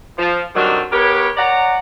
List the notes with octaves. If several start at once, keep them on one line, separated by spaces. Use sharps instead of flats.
F3
D3 D#3 F#3 G3 C4 D4
B3 G4 A#4 B4 C#5
C#5 D5 F#5 A#5